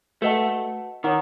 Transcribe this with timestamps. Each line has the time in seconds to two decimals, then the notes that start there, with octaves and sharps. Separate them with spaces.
0.22 A3 F#4 B4 D#5 F#5 A5
1.04 D#3 C#5 F#5 A#5 D6